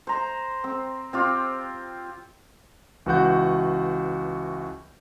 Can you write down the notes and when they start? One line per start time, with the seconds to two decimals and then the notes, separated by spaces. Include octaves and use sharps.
0.07 C5 A#5
0.64 C4
1.13 C4 F4 G4
3.06 C#2 E3 F#4 F#5 G6